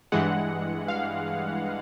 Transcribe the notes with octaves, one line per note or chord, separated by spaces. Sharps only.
G2 E3 G#3 F#5
F5